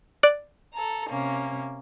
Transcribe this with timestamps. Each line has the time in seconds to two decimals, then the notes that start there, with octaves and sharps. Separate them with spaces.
0.23 D5 D6 F#6
0.73 A4 A#5
1.09 C3 A#3 C#4